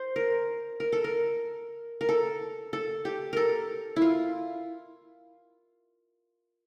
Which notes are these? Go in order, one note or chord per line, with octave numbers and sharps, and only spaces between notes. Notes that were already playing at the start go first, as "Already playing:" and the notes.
Already playing: C5
A#4
A#4
A4
A#4
A#4
A4
A4
G4
A4 A#4
E4
F4